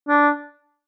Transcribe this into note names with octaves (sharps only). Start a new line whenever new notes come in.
D4